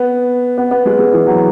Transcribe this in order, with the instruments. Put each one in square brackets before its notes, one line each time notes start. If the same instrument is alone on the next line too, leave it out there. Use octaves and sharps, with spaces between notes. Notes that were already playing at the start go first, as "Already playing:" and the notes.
Already playing: [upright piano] B3
B3
B3
G#3
G#3
E3
F#3